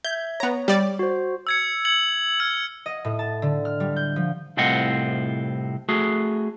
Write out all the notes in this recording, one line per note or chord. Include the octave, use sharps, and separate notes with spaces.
E5 G6 G#6
B3 C#5 A#5
G3 D5
F#4 C5
E6 G#6 C#7
G#6 C#7 F#7
F6 G#6 F#7
D#5
A2
A5
D3
F6
G3
G6
F3
C2 A2 C4 F4 D#5 F#5
A3 F#4 G#4